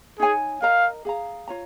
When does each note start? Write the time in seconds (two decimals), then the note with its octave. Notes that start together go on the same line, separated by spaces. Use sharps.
0.20 D#4 G#4 C#5 G#5
0.62 A#4 D#5 F5 A#5
1.05 G#4 F5 A#5
1.48 F4 C#5 A#5